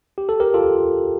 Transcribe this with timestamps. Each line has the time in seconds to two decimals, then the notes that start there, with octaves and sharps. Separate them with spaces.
0.18 G4
0.29 A4
0.40 G4 A#4
0.54 F4 A4